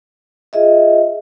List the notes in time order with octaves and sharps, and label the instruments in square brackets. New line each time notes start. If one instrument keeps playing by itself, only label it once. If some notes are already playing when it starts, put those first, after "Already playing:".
[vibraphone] F4 G#4 D#5 E5